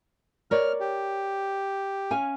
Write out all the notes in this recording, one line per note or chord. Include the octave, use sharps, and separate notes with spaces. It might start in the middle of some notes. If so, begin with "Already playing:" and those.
A#4 C#5 D5 F6
G4
C#4 F5 G#5